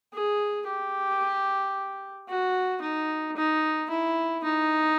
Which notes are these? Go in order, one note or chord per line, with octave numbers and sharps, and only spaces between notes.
G#4
G4
F#4
D#4
D#4
E4
D#4